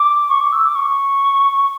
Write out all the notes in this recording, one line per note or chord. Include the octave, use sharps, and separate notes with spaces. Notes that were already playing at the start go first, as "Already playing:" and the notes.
Already playing: D6
C#6
D6
E6
D6
C#6